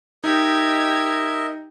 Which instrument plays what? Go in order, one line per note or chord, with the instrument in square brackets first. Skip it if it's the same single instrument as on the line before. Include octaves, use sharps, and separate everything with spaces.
[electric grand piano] D#4 [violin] G4 G#6 [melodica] A#4 D#5 E5